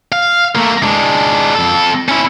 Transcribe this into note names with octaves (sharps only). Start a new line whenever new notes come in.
F5
A3 A#3
G#3 D4
F2 A4
C#4 E4